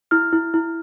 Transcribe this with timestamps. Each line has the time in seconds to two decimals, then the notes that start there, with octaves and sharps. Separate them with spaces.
0.11 E4 F6
0.33 E4
0.54 E4